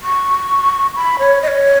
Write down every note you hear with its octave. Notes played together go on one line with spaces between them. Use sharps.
C#6
B5
C#5
D#5
C#5